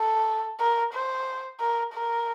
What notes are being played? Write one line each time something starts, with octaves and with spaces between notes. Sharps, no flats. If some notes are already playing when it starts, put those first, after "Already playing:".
Already playing: A4
A#4
C5
A#4
A#4